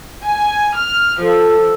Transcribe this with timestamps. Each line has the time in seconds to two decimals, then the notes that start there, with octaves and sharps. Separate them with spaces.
0.22 G#5
0.77 F6
1.22 F3 A4